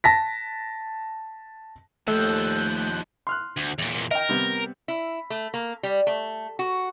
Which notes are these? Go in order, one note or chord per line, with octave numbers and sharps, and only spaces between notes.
A5 A#6 B6
D#2 D#3 F3 A3 A4 F#6 G6
C6 F6 F#6
D2
E2 A#2
A#4 D#5 G5
C3 G3 B3
E4
A3
A#3
G3
A3
F#4